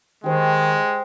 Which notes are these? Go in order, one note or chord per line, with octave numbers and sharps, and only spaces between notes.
D#3 G#3 G4 C5